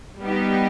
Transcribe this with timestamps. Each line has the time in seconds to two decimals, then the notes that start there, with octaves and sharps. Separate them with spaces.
0.21 G3 B3 D#4 G4